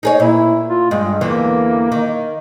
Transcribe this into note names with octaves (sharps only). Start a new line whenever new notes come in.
D#4 G#4 C#5
A#2 E4
F4
G2 G#3
E2 D3 E3 A#3
D#3